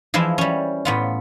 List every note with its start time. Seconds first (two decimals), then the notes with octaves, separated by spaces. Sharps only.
0.14 E3 F3 G#3 E4
0.38 G3 C#4
0.85 A2 B3 F4